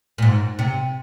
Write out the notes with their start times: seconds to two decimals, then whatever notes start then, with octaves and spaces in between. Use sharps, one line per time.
0.18 A#2
0.22 G#2
0.59 C3